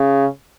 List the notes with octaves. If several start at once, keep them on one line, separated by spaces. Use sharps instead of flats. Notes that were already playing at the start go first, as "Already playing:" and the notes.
Already playing: C#3